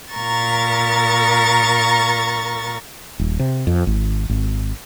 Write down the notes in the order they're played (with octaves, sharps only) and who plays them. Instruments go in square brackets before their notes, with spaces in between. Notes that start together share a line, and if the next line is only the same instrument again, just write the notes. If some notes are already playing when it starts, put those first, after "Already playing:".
[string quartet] A#2 A#4 A#5 C#6 A6
[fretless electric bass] D#1
C3
F2
G#1
G#1